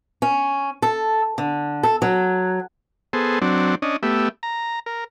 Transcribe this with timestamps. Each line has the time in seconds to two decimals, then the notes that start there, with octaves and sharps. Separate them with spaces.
0.22 C#4
0.82 A4
1.38 D3
1.83 A4
2.02 F#3
3.13 B3 G#4 A4 C5
3.42 F#3 C4 D4
3.82 C#4 D4 D#5
4.03 A3 B3 G4 E5
4.43 A#5
4.86 A#4